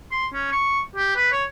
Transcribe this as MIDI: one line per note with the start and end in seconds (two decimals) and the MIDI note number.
0.11 0.26 84
0.33 0.49 61
0.52 0.80 85
0.96 1.13 67
1.16 1.30 71
1.32 1.44 73